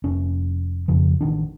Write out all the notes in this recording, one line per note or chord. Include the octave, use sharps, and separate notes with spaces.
F1 C#4
F2 C#3 F3
A1 D#3 D4